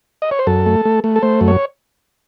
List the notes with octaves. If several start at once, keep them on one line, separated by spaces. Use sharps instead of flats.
D#5
C#5
C5
F#2 A4
A3
A3
A3
A4
A3 C5
F#2
C#5